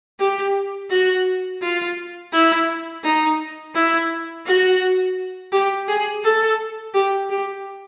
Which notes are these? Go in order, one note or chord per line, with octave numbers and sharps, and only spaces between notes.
G4
F#4
F4
E4
D#4
E4
F#4
G4
G#4
A4
G4
G4